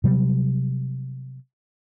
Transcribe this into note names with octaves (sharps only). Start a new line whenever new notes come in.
C3 F#3 G3